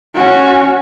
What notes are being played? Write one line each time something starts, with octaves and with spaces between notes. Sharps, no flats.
C#4 F#4